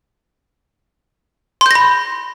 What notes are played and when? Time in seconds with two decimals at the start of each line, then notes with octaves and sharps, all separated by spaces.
1.61 C6
1.66 G6
1.71 A#6
1.75 B5